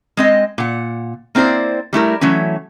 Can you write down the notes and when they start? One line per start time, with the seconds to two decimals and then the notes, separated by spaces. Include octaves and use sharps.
0.17 G#3 C4 D#5
0.58 A#2 F#5
1.35 A#3 C4 E4 C5 D5
1.93 G3 A3 E4 A#4
2.21 E3 F#3 A3 C#4